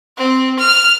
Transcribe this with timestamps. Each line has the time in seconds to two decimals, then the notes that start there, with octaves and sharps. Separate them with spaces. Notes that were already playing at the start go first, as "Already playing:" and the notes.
0.17 C4
0.59 F6